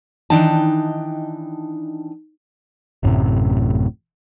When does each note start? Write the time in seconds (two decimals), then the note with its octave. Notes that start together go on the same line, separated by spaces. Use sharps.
0.30 D#3 E3 D4 D#4 G5 A5
3.03 A1 F#2 A2 C3